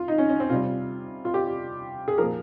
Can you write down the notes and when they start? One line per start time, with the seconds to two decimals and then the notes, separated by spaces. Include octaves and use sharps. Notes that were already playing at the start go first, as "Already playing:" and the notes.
Already playing: F4
0.08 D#4
0.18 C#4
0.29 C#4
0.40 C4
0.50 C3 G3 F4
1.25 F4
1.34 G4
2.08 G#4
2.18 A#2 F3 A#4